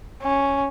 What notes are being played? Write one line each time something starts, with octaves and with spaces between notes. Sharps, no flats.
C#4